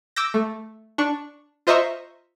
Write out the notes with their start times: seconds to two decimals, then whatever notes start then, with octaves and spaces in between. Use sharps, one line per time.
0.16 D6 E6 G6 A#6
0.34 A3
0.98 D4 C#6
1.67 F4 C5 D#5 E5 A#5 C#6